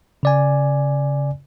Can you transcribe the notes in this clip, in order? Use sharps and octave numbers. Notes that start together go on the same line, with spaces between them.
C#3 D5 G#5